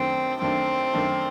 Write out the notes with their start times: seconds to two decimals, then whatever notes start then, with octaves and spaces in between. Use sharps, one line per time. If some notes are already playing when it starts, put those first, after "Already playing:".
Already playing: F#2 D#3 A3 C4 D4
0.41 F#2 D#3 A3 C4 D4
0.93 F#2 D#3 A3 D4